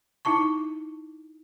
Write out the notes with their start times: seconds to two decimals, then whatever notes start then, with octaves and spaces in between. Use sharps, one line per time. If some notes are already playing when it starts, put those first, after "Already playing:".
0.25 D#4 E4 A5 C#6